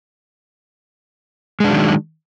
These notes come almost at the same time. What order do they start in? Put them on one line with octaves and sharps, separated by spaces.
G#3 D4 F#3 D#3